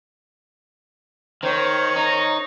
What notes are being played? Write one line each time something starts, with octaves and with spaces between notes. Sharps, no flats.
D#3 C5 C#5
D#4 A#5